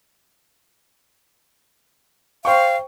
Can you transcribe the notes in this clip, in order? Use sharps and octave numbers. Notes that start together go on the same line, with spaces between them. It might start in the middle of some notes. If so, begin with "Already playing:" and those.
C5 F5 G5 C#6